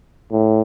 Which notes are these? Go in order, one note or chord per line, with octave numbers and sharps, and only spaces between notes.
A2